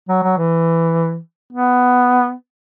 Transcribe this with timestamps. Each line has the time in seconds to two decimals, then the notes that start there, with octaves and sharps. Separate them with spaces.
0.09 F#3
0.23 F#3
0.37 E3
1.53 B3